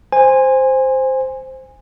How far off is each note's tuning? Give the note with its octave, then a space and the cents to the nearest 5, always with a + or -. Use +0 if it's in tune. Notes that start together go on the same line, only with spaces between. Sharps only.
C5 +0 G#5 -20